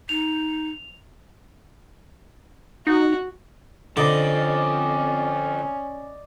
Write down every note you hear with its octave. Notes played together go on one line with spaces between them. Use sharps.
D#4 F7
D#4 F#4
D3 F3 C4 C#4 D5 D#5 B5